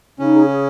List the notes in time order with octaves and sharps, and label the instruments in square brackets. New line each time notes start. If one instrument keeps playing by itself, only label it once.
[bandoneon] C#3 C#4 [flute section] D#4
[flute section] G#4
G#4